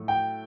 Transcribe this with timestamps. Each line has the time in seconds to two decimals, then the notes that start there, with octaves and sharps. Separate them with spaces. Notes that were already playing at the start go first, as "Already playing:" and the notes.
Already playing: A2 F#3 A3
0.08 G5